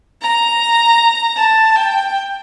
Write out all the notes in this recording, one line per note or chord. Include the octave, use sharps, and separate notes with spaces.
A#5
A5
G5